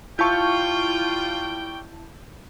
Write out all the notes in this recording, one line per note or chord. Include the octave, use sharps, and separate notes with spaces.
G3 E4 F4 G5 A5 C#6 G6